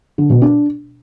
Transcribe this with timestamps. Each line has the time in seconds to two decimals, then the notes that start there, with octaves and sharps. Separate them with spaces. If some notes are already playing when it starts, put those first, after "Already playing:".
0.18 D3
0.30 B2
0.42 D4